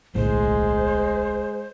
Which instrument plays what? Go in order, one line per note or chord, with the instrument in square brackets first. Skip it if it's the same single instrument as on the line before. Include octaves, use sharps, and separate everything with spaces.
[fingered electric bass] D1 B1 A2 [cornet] G#3 [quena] C5